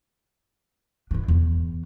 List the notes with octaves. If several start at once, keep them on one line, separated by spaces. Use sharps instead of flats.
D4 E4
E2